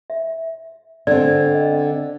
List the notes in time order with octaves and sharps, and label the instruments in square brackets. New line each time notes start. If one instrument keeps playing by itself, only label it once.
[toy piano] E5
[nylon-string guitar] D3 C4 [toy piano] D5
[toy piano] D#5